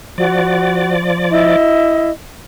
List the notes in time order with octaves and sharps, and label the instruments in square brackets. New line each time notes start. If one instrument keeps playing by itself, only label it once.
[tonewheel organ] F3 D5 [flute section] F#4
[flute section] E4 D#5